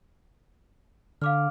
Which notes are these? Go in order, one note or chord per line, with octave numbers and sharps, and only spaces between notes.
D3 F5 D6 F6